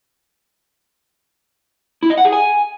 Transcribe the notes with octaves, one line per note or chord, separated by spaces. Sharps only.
E4
D#5
F#5
G#4
G#5